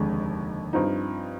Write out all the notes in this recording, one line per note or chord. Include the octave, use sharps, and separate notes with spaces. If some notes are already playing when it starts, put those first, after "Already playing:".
Already playing: F1 D#2 D3 G#3
G2 F3 C4 D#4